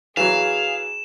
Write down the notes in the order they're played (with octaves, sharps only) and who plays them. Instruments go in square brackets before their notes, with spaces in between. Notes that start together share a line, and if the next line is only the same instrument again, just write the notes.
[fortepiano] E3 F#3 [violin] G#4 [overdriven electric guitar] F5 [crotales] E7